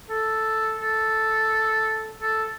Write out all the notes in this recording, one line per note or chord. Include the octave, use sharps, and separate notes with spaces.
A4
A4
A4